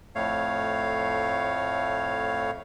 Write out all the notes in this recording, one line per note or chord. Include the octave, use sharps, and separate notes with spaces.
F2 A2 A3 C#5 F5